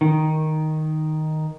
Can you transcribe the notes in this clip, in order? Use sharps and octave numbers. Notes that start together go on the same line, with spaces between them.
D#3